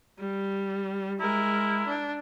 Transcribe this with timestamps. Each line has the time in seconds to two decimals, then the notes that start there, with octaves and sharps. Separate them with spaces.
0.19 G3
1.20 G#3 E4 A#4
1.87 D4